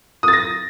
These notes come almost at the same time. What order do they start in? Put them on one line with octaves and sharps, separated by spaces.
D#6 A6 A#6